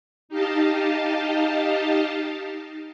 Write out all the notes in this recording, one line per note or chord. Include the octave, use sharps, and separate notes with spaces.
D#4 G4 D#5 F5 A5